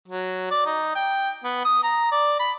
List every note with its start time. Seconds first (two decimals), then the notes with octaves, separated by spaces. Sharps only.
0.08 F#3
0.51 D5
0.66 D#4
0.95 G5
1.44 B3
1.65 D#6
1.83 A#5
2.12 D5
2.40 B5